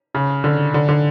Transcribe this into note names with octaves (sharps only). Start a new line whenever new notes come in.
C#3
D3
D3
D3